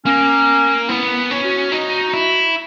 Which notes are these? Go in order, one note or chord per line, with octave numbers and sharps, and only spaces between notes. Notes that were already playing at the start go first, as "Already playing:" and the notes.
A#3 C#4
B3 E4
C#4
F#4
D#4 F#4
E4